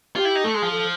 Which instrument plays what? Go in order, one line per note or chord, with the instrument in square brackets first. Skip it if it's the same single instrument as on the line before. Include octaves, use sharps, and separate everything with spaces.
[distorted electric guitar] F4 [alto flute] G4
[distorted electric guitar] E4
D#4
[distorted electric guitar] A3 [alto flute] A4
[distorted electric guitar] G#3
[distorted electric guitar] F3 [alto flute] G#4
[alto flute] A4